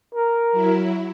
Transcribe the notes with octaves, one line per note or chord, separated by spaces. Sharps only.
A#4
F#3 E4